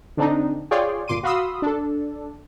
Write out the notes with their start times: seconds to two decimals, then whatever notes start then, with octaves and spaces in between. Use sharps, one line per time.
0.17 D3 C4 D4 D#4
0.71 F4 G#4 C#5 D5 G5 C6
1.08 G1 A#2 C6 D6 D#7
1.23 F#4 F5 B5 C6 D#6 E6
1.62 D4 A4